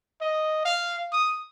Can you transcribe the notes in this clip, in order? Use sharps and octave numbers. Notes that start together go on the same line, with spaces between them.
D#5
F5
D#6